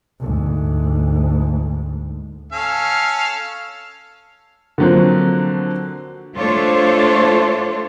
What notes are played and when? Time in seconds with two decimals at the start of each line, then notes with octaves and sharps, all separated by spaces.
0.20 D2 G#2
2.52 C#4 A4 F5
4.78 D3 F3 F#3 A#3 C4
6.36 A3 D4 F4 A4 C5 C#5